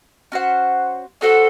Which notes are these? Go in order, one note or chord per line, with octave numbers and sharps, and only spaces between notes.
C#4 F#4 C5 F#5
C#4 F#4 A4 C5 F#5